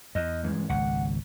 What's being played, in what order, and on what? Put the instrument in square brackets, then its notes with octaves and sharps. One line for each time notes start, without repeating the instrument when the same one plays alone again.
[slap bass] E2 [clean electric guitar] D#5
[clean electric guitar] G2 E3 G#3
[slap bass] G#1 C#2 [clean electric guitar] F#5